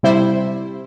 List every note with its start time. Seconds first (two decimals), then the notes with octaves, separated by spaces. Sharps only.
0.03 C3 G3 E4 C5